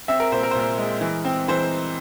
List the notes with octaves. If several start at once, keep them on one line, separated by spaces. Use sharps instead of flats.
C4 E5
A#4
A#2 C5
A#4
C5
A#2 A#4
G#3
E3
C4
E3 C5